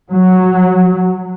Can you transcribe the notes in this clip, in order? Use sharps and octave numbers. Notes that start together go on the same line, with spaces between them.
F#3